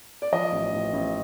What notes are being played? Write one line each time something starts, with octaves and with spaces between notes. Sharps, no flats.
D5
F3 D#5
A1
A1
A1